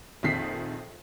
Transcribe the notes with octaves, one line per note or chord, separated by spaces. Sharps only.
A#1 F2 D#3 B6 C7